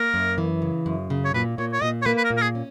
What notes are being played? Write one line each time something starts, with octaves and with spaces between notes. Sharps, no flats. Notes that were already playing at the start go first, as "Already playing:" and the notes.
Already playing: A#3 A#4
F#2
E3
C#3
F#2
C#3
C#5
A#2 B4
A#2 C#5
C#5
A#2 D#5
C#5
A#3 B4
B4
A#4
A#2
A#4
G#4
C#4